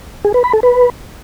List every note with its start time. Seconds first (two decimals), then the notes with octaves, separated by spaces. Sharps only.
0.25 G#4
0.34 B4
0.44 B5
0.53 A4
0.63 B4